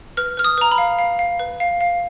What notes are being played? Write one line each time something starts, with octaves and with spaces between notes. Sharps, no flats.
B4 F6
B4 F6
D#6
B4 A#5
B5
F5
F5
F5
B4
F5
F5